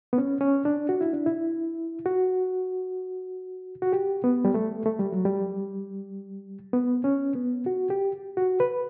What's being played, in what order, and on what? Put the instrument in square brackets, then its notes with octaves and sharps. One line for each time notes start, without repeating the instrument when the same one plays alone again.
[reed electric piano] B3
C#4
C#4
D4
F#4
E4
D4
E4
F#4
F#4
G4
B3
G3
A3
A3
G3
F#3
G3
B3
C#4
B3
F#4
G4
F#4
B4